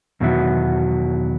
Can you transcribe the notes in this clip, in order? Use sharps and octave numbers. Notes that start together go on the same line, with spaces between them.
E2 B2 D#3 F#3 E4 F#4